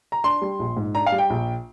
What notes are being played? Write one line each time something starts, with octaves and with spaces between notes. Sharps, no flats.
A#5
D4 C6
G3
A#1
G#2
D4 A#5
F5
G3
G5
A#1